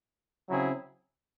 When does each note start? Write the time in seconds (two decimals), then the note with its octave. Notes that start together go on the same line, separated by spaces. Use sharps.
0.49 C#3 F#3 C4 E4 G#4